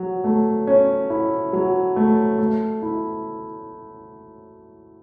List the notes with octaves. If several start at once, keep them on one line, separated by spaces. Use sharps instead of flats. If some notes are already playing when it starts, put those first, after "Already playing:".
Already playing: F#3
A3
C#4
E4
F#3
A3
A3
E4